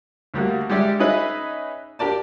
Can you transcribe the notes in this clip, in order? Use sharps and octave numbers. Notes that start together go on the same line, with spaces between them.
D2 G3 A#3 F#4
G3 G#3 D4 G4 D5 E5
C#4 D#4 G#4 B4 D#5 E5
D4 G4 A#4 D5 A5